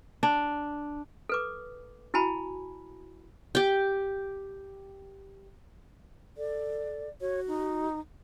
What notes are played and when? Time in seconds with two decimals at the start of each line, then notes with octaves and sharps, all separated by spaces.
0.23 D4
1.29 A4 B4 D6
2.14 E4 F#4 G#5 A5 B5
3.55 G4 G5
6.37 A4 D5
7.21 F#4 C#5
7.48 D#4